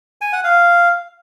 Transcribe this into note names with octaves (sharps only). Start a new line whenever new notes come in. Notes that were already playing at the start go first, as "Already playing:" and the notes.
G#5
F#5
F5